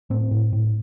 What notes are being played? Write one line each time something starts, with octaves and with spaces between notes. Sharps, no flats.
A2 C4
A2
A2